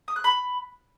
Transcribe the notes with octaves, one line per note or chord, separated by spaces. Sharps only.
D#6
F#6
B5